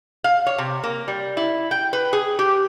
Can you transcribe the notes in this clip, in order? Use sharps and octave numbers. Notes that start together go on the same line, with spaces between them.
F5
C#5
C3
A#3
G3
E4
G5
B4
G#4
G4